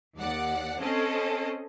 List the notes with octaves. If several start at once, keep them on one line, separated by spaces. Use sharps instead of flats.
D#2 D5 F#5
C4 C#4 A4 D#5